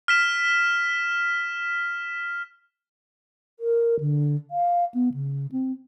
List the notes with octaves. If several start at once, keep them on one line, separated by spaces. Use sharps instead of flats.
F6 B6 E7
A#4
D3
F5
B3
C#3
C4